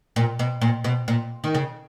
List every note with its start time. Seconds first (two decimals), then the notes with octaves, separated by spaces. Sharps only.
0.16 A#2
0.39 B2
0.61 A#2
0.84 B2
1.08 A#2
1.44 D#3
1.55 C#3